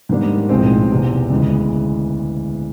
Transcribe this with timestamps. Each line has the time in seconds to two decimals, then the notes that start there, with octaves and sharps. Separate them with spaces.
0.09 G#2 D#3 G3 A#3 D4
0.49 B1 A2 F3 G#3 C4
0.91 E1 E2 C3
1.30 D2 C#3 E3 G#3